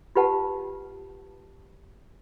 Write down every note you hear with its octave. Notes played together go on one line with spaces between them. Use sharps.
F4 G4 B4 F#5 A5